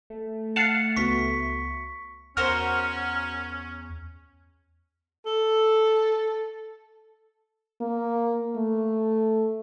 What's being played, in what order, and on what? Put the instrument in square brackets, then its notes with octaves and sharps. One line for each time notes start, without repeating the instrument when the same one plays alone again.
[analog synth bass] A3
[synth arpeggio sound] F5 F#5 A5 [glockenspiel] C#7
[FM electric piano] C#2 B3 F#4 [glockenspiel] C#6 B6
[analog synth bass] E2 [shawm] C#4 [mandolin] F#4 A#4 C5 [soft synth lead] F6
[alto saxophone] A4
[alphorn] A#3
A3